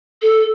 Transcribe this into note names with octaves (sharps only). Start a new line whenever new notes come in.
A4